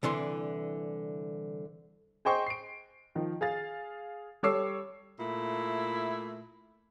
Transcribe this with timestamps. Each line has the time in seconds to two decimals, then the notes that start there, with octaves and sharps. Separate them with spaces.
0.03 C2 D3 E3 C6
2.25 G#4 C5 D#5 G5 C6 C#6
2.47 C7 D7
3.15 D#3 F3
3.41 G#4 F5 A6
4.43 G3 A4 C#5 D6 E6 C7
5.20 A#2 A3 E4